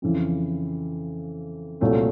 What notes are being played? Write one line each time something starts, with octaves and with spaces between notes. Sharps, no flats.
F2 C#3 E3
C2 A#2 F#3 A3 C4